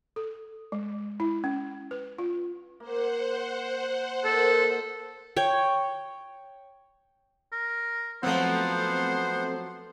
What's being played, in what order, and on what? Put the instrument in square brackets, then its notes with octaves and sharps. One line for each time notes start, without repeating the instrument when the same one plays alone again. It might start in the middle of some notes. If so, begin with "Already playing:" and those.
[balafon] A4
G#3
E4
C#4
B4
F4
[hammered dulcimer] A#3 [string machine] C5 F#5
[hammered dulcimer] A#2 D#4 [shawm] A4
[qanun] C#5 G5
[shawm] A#4
[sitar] F3 F#3 [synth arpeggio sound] A3 C4 [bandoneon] B3 F#5 [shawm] C5